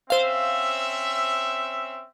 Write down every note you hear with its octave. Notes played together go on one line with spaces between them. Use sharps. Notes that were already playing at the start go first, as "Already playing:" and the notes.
C4 C#4 C5 E5 F5